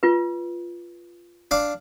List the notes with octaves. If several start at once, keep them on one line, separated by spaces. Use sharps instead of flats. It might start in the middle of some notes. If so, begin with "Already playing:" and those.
F4 B4
D4 F5 D6